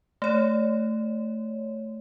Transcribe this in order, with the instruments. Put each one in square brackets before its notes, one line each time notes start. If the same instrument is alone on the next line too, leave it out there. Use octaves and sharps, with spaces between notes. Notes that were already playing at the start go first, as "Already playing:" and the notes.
[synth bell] A3 C#5